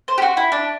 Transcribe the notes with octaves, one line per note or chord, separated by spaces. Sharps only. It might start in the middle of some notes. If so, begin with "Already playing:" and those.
C5
G4
F#4
E4
D4